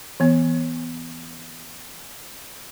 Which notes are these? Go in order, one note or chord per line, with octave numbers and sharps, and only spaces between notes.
E3 B3